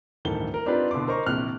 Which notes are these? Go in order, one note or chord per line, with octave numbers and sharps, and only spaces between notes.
D1 G2 D#3 E3 A4 G7
A#4
C4 D4 D#4 F4 G4 B4
B2 D3 E4 C6 D6
A#4 C5 D#5 A#5 C#6
A#1 C3 E3 F6 F#6